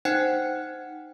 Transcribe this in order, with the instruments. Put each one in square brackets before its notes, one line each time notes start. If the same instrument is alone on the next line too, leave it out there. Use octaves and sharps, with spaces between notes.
[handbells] D#4 C5 F#5 G5 F#6 C#7